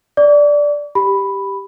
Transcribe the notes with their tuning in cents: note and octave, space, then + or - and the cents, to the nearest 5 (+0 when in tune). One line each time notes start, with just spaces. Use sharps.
D5 -5 D6 -45
G4 +0 B5 +0